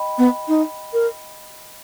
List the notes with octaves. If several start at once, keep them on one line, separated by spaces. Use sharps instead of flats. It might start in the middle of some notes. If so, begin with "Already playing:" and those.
Already playing: D#5 G5 B5
B3
D#4
A#4